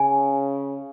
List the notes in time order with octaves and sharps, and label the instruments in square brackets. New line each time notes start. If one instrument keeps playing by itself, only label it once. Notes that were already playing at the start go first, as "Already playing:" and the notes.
Already playing: [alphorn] C#3 [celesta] G#5